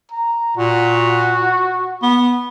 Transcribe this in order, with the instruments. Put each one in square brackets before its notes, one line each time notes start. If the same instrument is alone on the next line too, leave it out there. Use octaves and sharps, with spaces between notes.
[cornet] A#5
[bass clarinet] A#2 [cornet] F#4
[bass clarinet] B3